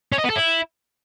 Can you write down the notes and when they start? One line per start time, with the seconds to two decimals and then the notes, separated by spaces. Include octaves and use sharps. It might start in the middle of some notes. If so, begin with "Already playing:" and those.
0.12 C#4
0.18 D#5
0.24 B3
0.30 A4
0.36 E4